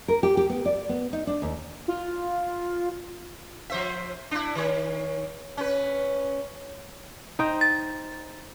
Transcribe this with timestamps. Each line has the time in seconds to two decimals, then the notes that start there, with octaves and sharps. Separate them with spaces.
0.08 A#4
0.23 G4
0.37 G4
0.50 B3
0.65 D5
0.89 B3
1.13 D#4
1.27 D4
1.42 D#2
1.88 F4
3.70 F3 C5 E5
4.31 D4 E4
4.55 D#3 C#5
5.57 C#4 B4
7.39 D#4 C5 G5
7.61 A6